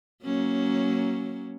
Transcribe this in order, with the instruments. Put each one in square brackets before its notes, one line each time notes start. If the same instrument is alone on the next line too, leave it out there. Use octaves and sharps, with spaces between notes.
[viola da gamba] F#3 A#3 C#4